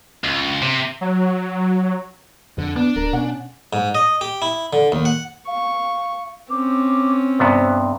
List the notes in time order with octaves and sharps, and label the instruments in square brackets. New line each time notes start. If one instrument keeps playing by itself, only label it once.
[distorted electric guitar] C#2
C3
[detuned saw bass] F#3
[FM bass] F2 [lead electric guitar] D3
[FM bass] B3 [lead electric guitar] D4
[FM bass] D1 [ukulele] A#4
[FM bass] B2 [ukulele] C#4 F#5
[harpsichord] G#2
D#5
G4
E4
D3
D#2
F#5
[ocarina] F5 [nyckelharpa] C#6
[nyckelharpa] C4 C#4 [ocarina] D6
[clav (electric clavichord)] G2 C3 B3 [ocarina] C5